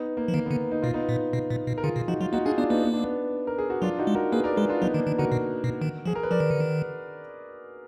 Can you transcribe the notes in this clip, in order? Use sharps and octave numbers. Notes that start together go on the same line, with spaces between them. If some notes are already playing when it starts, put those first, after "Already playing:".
Already playing: B3 D#4
A#3
F3
D#3 A#3
D3 B3
D#4
B2 F4
B3 D#4
A#2
B2
A#2
B2
A#4
D3 F4 G#4
B2
F3 D#4 F#4
F#3 F4
A#3 D#4 F#4
D4 F4 G#4
B3 D4 F4
A#3 B3 D#4
B3
D4
B3
A#4
G#4
F#4
F#3 D4 F4
D#4 F#4
G#3
F#4 A#4
A#3 G#4 B4
A#4 D5
G#3 G#4 B4
D4 F4
F#3 B3 D#4
D#3 A#3 D4
D#3
D3 F#4 A#4
B2
B2
D#3
F3 G#4
A#4
B4
F3 A#4 D5
D#3
D3
D#3